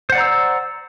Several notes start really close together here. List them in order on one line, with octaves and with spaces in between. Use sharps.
C5 F#5 D5 A#5 E6